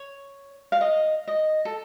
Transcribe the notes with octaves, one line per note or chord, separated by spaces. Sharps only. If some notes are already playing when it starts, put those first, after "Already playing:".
Already playing: C#5
F5
D#5
D#5
A4